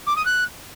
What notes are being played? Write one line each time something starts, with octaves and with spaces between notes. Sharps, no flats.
D6
D#6
F#6